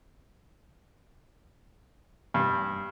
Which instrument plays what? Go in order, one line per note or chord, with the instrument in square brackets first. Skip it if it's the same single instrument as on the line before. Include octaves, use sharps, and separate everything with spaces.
[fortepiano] G2